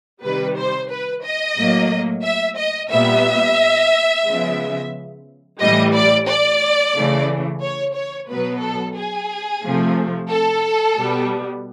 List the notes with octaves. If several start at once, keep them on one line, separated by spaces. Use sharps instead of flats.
C3 D#3 G3 B4
C5
B4
D#5
A2 F#3 A#3
E5
D#5
A#2 G3 B3 E5
C#3 F3 G#3 B3
A2 E3 G3 D#5
D5
D5
C#3 E3 A3
C#5
C#5
B2 F#3 B3 B4
A4
G#4
C3 F3 A3
A4
B2 G3 B3